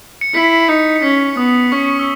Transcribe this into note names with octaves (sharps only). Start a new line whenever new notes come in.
C#7
E4 B6
D#4 C#7
C#7
C#4 B6
B3 D#6
C#4 C#6
E6